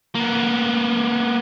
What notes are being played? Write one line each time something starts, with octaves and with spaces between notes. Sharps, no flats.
A#3 B3